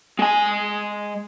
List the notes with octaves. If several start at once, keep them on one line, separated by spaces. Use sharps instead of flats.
G#3 G#5